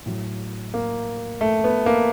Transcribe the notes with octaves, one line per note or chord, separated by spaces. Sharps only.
A2 F#3
A#3
A3
B3
A#3